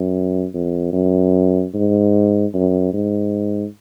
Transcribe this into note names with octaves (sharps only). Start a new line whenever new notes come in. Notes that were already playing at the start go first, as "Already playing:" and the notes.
Already playing: F#2
F2
F#2
G#2
F#2
G#2